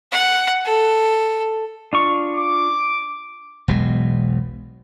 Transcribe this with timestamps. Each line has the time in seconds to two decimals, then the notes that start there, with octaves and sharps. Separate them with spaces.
0.12 F#5
0.65 A4
1.93 D4 F4 C#6
2.35 D6
3.68 E1 B1 B2 G#3